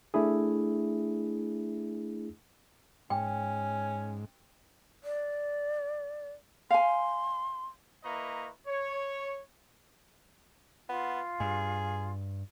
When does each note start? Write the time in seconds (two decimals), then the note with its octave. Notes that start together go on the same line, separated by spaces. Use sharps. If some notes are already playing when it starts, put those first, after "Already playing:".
0.14 A3 D4 E4 G#4
3.10 G#2 C#4 G5
5.04 D5
6.70 F5 G#5 C6
8.04 A#3 E4 B4 D#5 A#5 C#6
8.67 C#5
10.89 B3 F4
11.40 G2 G#4